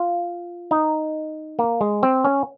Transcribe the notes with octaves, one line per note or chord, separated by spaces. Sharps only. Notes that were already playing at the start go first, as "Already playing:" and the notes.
Already playing: F4
D#4
A#3
G#3
C4
C#4